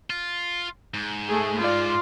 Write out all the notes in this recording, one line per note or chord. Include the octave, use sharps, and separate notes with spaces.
F4
G#2
A3 G#4
F4 D5